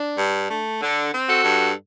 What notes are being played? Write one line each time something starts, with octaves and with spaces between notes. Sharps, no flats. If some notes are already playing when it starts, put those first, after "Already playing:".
Already playing: D4
G2
A3
D3
C4
F#4 A4
G2